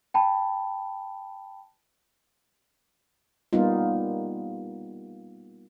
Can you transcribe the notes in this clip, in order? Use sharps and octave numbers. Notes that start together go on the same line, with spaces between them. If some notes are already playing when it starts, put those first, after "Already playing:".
G5 A5 B5
G3 A#3 B3 D#4 F4